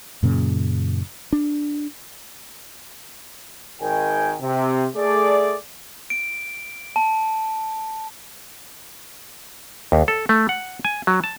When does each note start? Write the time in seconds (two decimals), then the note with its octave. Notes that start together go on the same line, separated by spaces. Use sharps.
0.23 F#2 A#2 C#3
1.33 D4
3.81 G#1 D#3 G5 G#5
4.41 C3
4.95 A3 G#4 D5
6.10 D7
6.96 A5
9.92 D#2
10.08 A4
10.29 A3
10.49 F#5
10.85 G#5
11.07 F#3
11.24 A5